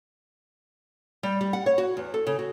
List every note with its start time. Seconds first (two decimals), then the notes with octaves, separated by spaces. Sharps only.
1.23 G3
1.41 G3
1.53 F#5
1.66 C#5
1.78 F#4
1.97 E2
2.14 A4
2.27 C#3
2.39 F#4